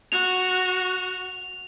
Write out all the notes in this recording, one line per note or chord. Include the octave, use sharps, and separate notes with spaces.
F#4 F7